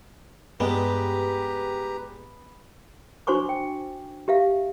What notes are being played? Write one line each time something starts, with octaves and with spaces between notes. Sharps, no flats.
G2 G3 G#3 B3 G4 B4 A#5
D4 F#4 C5 G#5 C#6 D6
G5
G4 E5 F5